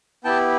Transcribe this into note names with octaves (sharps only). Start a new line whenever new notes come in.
B3 E4 G4 G5 A5